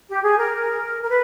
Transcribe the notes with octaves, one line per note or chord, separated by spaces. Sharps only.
G4
G#4
A#4
A#4
B4